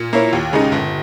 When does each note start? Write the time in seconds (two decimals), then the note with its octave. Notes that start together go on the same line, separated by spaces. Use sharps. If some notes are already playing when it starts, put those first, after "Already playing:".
Already playing: A#2
0.13 A#3 E4 A#4 C#5
0.33 D#2
0.53 C#3 G#3 D#4
0.72 G1